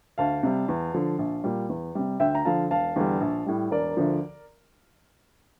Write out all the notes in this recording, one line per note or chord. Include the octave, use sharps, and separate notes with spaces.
D2 F5 A5
C3 G3
E2
D3 F3
A#1
A#2 G3
E2
C3 G3
D2 E5 G5
A#5
D3 F3 F5 A5
E1 F5 A5
E2 D3 G3
A#1
A2 G3
E1 A#4 D5
D2 D3 F3